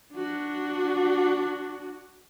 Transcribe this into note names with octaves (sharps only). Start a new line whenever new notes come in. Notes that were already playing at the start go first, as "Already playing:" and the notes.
D4 F#4